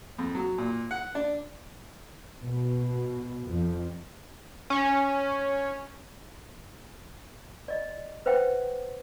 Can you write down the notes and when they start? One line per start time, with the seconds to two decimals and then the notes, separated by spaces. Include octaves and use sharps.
0.19 F2
0.35 F#3
0.58 A#2
0.91 F#5
1.15 D4
2.41 B2
3.50 F2
4.70 C#4
7.68 D5 D#5
8.26 B4 C5 E5 F#5 G5